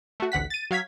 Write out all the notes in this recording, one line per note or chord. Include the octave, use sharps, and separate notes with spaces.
A3 F#4
A1 D2 F#5 B6
A6 D#7
F#3 F5 G#6 B6